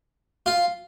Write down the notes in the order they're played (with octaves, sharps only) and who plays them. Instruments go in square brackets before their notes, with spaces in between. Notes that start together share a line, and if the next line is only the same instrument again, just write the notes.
[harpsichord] F4